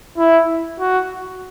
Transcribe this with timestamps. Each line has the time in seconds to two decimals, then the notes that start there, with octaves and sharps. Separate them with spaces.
0.18 E4
0.80 F#4